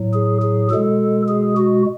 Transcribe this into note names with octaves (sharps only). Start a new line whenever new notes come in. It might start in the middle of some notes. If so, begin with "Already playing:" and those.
Already playing: A2 F#3
G#4
G#4
B2 G#3 A4
G#4
F#4